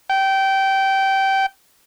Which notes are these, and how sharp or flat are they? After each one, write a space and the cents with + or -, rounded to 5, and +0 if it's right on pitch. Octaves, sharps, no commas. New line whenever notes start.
G5 -20